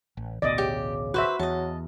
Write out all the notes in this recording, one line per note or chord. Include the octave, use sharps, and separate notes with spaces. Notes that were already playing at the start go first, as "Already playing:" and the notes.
A1
A1 D2 B2 D5 D#5
C#3 G4
F#4 B4 C5 E5
E2 F#3 D#5 A5